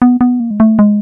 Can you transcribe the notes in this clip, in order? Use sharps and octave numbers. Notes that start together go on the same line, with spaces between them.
B3
B3
A#3
G#3
A3
G#3